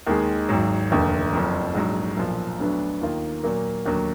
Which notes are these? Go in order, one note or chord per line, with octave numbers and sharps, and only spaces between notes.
D#2 D#3 G#3
G#1 G#2 F#3
F1 D#2 D3
F#1 F2 F3
A#1 G#2 F#3
B1 A#2 F3
D2 D3 F#3 B3 D4
D#2 D#3 A#3 F4
A#2 F#3 A#3
D#2 D3 F#3 A#3